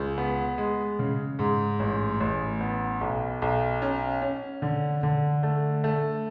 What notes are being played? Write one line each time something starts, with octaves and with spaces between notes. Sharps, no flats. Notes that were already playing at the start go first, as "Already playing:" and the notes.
Already playing: C#2
B3
G#3
C#3
G#2
A1
A1
B3
B1
B1
C#4
C#4
D3
D3
A3
A3